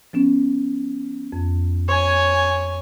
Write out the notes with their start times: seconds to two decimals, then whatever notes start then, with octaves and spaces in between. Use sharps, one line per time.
0.13 F3 B3 C#4
1.33 F2
1.88 C#5 G#5